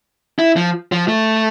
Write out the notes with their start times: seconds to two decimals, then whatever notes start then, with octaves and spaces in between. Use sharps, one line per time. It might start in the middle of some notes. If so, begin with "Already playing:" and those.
0.39 E4
0.56 F3
0.92 F3
1.08 A3